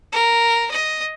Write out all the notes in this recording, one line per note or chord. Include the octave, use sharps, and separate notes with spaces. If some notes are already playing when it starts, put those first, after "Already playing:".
A#4
D#5